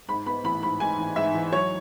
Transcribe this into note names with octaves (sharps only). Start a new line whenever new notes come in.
G#2 B5
B3 B5
A1 B5
G#2 B5
G#2 G#5
A1
G#2 E5
E3
F#3 C#5